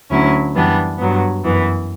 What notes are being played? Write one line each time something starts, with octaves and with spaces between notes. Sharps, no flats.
D2 D3 F#3 C#4 E4
F#2 E3 G3 B3 D4
G2 F#3 B3
F#2 E3 B3